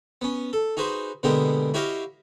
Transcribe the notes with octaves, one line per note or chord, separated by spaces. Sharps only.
B3 C#4
A4
D#4 F#4 G#4 B4 C5
B2 D3 G#3 A#3 B3 G4
E4 F#4 G4 C#5 D#5 F5